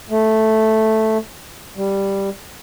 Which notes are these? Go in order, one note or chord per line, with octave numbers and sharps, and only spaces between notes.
A3
G3